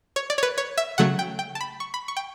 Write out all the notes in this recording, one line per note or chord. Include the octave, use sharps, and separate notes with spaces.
C#5
D5
C#5
B4
C#5
E5
C#3 F#3 A3 F#5
G5
G5
A5
B5
C#6
B5
C#6
G5